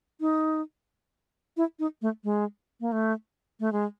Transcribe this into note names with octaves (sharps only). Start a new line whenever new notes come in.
D#4
E4
D#4
A3
G#3
A#3
A3
A3
G#3